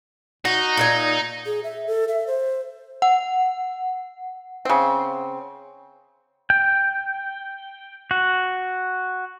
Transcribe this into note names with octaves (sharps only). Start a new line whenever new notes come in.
D#4 F#4
A#2 A4 G#5
G#4
E5
A4
E5
C5
F#5
C#3 C4
G5
F#4